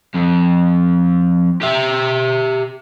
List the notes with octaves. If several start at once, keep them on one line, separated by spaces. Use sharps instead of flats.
F2
G4 E5